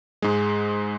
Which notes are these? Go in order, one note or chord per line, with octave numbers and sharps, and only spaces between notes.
G#2 G#3